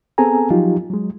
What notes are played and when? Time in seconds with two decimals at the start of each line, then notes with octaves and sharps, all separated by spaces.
0.18 B3 C4 G#4 A4 G#5 A#5
0.50 F3 F#3 D#4 F4 G4
0.90 F#3 G#3